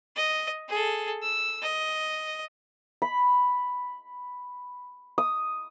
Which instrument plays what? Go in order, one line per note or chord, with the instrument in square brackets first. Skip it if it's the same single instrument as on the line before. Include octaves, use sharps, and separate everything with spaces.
[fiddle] D#5
G#4 A4
E6
D#5
[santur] B5
D#6